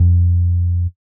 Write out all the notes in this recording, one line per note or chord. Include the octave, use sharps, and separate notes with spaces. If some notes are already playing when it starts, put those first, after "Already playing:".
Already playing: F2